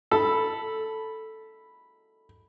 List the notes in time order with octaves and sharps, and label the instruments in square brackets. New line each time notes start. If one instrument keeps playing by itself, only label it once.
[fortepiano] A4 [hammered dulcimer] B5